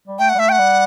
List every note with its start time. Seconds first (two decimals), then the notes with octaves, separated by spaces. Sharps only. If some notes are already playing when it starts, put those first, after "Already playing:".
0.08 G3
0.19 A3 G5
0.29 F#5
0.35 G3
0.38 A3 E5
0.49 G5
0.52 F#5
0.59 G3